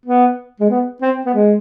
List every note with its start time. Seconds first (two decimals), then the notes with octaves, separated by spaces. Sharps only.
0.06 B3
0.60 G#3
0.69 B3
1.02 C4
1.26 B3
1.34 G#3